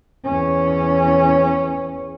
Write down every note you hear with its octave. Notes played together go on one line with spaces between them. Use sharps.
E2 C#4